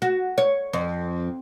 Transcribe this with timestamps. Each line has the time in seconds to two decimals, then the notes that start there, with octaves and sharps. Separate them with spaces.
0.02 F#4
0.38 C#5
0.73 F2